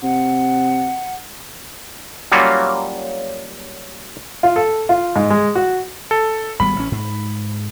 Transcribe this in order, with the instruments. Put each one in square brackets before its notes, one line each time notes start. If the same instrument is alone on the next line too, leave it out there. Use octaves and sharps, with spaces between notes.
[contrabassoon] C3 [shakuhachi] F#5
[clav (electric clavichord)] F#3 G3 A#3 C#4 F4 F#4
[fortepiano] F4
A4
F4
G#2
G#3
F#4
[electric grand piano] A4
[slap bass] G#1 G3 B3 [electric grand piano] B5
[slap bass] A1 C#4
G#2